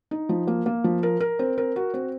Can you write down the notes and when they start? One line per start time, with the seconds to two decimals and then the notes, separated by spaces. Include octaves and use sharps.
0.11 D#4
0.29 F3
0.47 A#3
0.66 A#3
0.84 F3
1.03 A#4
1.20 A#4
1.39 C4
1.58 A#4
1.76 F#4
1.94 C4